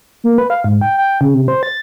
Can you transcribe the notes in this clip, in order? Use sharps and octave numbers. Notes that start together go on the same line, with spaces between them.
A#3
B4
F5
G#2
G5
G5
C#3
C3
C5
A6